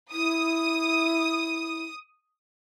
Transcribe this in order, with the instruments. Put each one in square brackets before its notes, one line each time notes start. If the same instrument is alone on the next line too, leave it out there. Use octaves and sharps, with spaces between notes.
[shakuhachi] E4 [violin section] D#6